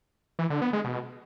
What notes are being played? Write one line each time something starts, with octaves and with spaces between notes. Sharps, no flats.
E3
D3
B3
G#3
B2